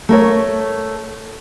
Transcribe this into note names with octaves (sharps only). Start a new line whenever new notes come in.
A3 A#4 C#5